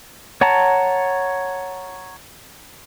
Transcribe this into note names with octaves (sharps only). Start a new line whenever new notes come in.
C#5 F#5 A5 A#5